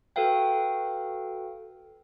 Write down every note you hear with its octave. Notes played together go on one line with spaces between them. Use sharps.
F#4 A4 B4 F5 G5